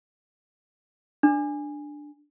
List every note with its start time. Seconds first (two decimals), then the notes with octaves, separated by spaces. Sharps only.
1.23 D4